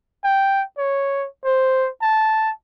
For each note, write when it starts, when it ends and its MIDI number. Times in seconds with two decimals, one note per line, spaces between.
0.24 0.63 79
0.78 1.27 73
1.45 1.89 72
2.02 2.52 81